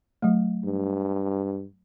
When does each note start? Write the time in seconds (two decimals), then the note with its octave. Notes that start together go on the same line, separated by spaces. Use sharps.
0.22 F#3 A3
0.64 G2